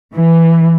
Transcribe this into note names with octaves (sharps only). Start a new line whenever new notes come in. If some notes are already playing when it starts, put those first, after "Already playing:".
E3